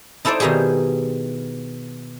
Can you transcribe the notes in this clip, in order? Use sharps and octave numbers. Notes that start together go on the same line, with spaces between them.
D#4 E4 A4 C5 D5
B2 D#3 D#4 E4 G4 G#4